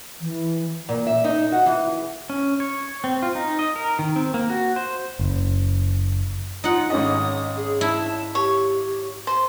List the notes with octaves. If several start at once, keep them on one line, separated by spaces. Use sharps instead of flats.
E3
A#2
E5
D#4
F#4
E3
G#4
C#4
C#5
C4
F4
D#4
D#5
A#4
D#3
C4
A#3
F#4
C5
F#1
D#4 F4 F#5
G#1 C#4 D#5 D#6
G#4
E4 A5
G4 C#5
C5